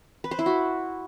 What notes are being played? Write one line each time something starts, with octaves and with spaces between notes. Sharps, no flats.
B4
C5
E4
F#4